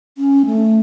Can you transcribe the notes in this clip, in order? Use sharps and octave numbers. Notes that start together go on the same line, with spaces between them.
C#4
A3